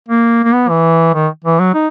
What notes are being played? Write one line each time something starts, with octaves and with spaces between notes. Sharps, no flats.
A#3
A#3
B3
E3
D#3
E3
F#3
D#4